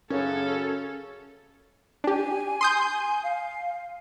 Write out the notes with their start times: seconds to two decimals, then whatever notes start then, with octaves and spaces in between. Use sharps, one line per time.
0.10 F#2 C#3 C#4 A4
2.04 D4 G4 G#5
2.61 C6 D#6 G6
3.22 F5